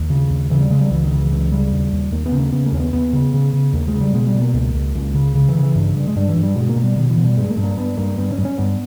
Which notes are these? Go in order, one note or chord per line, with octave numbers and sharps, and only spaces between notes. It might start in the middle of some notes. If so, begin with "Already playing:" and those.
Already playing: D#2 D#3
C#3
D#2
C#3 E3
G3
C#3 G#3
G3
C#2 E3
D#3
C#3
E3
C#2 E3
C#3 G3
D#2
D#2
D#2 A#3
B3
C#3
A#3
C#3 B3
A#3
D#2 C#4
B3
D#2 B3
C#3
C#3
C#3
D#2 A#3
G#3
C#3
G3
B2 G#3
G3
B2
A#3
C#2 A#3
C#2
C#2
C#3
C#3
E3
C#3
E3
G2
G2
G#3
G2 G3
E3
G2
G3
B2 G#3
A#3
B2
G3
B2 D#3
E3
B2
G3
G2 G#3
A#3
G2
A#3
G2 B3
G2 A#3
G2 B3
C#4
G2
C#4
G2 B3